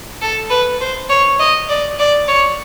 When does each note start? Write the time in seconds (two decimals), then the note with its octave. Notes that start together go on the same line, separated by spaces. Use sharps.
0.22 A4
0.50 B4
0.81 C5
1.09 C#5
1.40 D#5
1.69 D5
1.99 D5
2.28 C#5